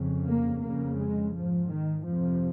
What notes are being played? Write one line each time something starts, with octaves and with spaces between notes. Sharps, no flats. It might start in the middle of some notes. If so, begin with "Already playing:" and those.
Already playing: F2 C#3
A#3
F2 C#3 A#3
G#3
G#2 F3
D#3
F2 C3 F3